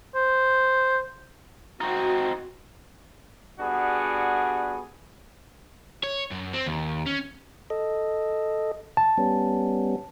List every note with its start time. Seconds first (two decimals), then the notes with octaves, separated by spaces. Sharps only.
0.15 C5
1.81 C4 D#4 F#4
3.60 G3 B3 D4 F#4 G#4
6.04 C#5
6.32 F#2
6.54 C4
6.66 D#2
7.06 C#4
7.70 A4 D#5
8.97 A5
9.18 G3 B3 C#4